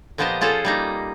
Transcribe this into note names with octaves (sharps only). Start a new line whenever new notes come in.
A#2 F3 B3 G4 C5 D#5
C#4 F4 G#4 A4 C5
G3 A#3 D#4